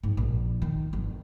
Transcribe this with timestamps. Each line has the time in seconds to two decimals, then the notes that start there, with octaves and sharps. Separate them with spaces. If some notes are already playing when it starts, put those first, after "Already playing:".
0.03 G#2 D#4
0.17 A#1
0.62 D#3
0.93 G1